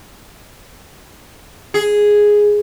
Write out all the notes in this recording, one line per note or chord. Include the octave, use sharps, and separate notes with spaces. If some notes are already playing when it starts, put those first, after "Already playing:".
G#4